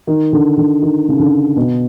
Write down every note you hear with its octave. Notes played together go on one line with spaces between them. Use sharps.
D#3
D3
D3
D#3
C#3
D3
B2